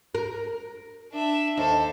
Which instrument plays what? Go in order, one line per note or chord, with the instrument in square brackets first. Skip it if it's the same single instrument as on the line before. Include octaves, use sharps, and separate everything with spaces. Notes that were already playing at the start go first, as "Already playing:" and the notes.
[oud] A#4
[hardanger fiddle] D4 E5
[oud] D#2 [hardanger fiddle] A4 C5